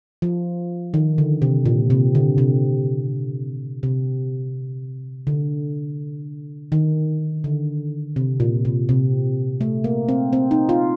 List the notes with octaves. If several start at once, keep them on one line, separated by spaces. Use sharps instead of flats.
F3
D#3
D3
C3
A#2
C3
D3
C3
C3
D3
D#3
D3
C3
A#2
C3
C3
A3
A#3
C4
C4
D#4
F4